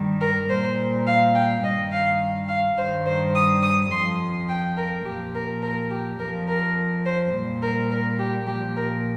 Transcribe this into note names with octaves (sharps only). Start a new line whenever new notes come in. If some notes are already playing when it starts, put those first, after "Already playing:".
Already playing: G2 D#3 G3
A#4
A#2 G3 C5
F5
G5
G2 D#3 G3 D#5
F5
F5
G2 D#3 G3 C5
C5
D#6
D#6
F2 F3 C6
G5
A#4
A#2 F3 G4
A#4
A#4
G4
F2 F3 A#4
A#4
C5
A#2 G3
A#4
A#4
G4
A#2 F3 G4
A#4